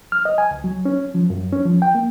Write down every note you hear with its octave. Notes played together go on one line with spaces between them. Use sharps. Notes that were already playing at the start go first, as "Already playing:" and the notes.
F6
D#5
G#5
C#2
F#3
C#4
F3
F#2
C#4
F3
G5
A#3